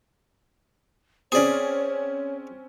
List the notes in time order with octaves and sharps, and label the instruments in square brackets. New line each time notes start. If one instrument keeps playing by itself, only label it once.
[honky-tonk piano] C4 C#4 [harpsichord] G#4 D5 [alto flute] C#5